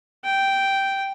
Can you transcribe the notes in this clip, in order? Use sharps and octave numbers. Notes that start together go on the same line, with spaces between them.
G5